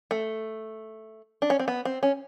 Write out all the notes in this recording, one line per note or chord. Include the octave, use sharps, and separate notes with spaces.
A3
D4
C#4
C4
B3
C4
C#4